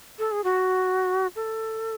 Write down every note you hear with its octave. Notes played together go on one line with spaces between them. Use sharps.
A4
G#4
F#4
A4